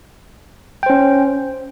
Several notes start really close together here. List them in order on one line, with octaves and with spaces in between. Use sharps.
G5 C5 C#4